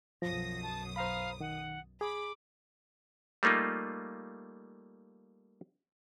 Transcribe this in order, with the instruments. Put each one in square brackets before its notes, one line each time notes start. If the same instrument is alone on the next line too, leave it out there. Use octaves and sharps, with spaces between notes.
[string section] B1 F#2 D#6 [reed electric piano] F3 [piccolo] A#6
[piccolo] A5
[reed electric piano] C5 A#5 B5 [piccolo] F5
[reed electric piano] D#3 [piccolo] F#5
[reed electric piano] G#4 [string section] B5 [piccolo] D6
[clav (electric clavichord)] G3 A3 A#3 D#4 F4